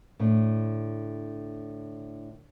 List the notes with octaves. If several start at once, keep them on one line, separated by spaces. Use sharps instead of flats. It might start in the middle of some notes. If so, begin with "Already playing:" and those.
A2 D3